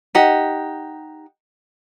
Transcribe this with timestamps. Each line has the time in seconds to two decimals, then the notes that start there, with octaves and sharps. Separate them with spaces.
0.15 D#4 G4 F#5